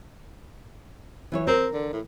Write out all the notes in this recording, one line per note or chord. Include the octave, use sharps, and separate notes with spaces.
E3 E4 C#5
C4 A#4
D3
A2